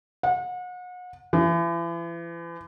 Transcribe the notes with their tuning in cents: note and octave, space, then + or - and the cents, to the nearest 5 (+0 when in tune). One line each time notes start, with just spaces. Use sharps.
F#5 -35
E3 +40